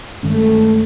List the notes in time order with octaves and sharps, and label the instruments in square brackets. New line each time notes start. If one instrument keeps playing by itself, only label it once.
[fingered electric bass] G2 D#3 G#3 C#4 [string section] A3